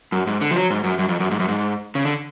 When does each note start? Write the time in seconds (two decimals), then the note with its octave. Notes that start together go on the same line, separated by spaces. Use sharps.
0.12 F#2
0.27 G#2
0.41 D3
0.51 F3
0.56 F#3
0.70 G#2
0.84 F#2
0.99 F#2
1.08 F2
1.20 F#2
1.31 G#2
1.40 F#2
1.48 G#2
1.95 C#3
2.05 D3